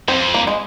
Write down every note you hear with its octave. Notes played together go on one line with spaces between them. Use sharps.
F2 C4
A#3
G#3